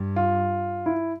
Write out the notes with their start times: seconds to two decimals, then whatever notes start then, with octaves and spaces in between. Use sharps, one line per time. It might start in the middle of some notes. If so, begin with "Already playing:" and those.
Already playing: G2
0.16 F4
0.86 E4